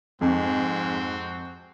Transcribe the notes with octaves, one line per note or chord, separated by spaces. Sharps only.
F2 G#2 C4 F#4